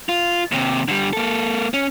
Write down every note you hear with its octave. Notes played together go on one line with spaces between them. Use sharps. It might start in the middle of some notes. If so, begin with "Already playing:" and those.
F4
D#2 C3
D3 G3
A#3 A4
C#4